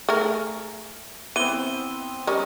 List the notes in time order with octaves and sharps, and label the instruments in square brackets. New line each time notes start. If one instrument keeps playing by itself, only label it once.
[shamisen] A3 G#4 A#4
[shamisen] E3 [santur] B3 C4 [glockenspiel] D#7 G7
[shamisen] G3 C#4 [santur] A#4 D#5 D#6